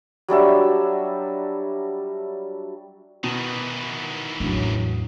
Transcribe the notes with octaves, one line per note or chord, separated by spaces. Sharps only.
F#3 G3 D4 E5
B2 D#3 E3
A1 E2 F#3 D4